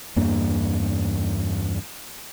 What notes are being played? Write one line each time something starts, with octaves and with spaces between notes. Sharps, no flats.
E2 G2 A#3 D4